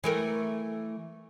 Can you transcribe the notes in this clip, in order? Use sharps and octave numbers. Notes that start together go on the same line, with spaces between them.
E3 A3 A#4